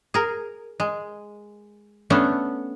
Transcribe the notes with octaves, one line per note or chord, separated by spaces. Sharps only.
G#4 A#4
G#3
A3 B3 C#4 D4 A4